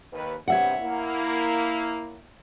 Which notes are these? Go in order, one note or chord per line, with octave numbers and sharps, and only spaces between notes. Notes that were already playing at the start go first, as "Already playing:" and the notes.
D#2 B4
E2 G2 C3 C#5 E5 F#5
A#3 E4